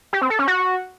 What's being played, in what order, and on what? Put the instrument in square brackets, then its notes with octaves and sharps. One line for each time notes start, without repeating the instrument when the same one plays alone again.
[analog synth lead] G4
C4
A4
C#4
F#4